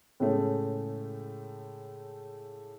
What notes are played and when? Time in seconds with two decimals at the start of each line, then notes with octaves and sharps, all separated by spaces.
0.20 A2 C#3 G#3 A3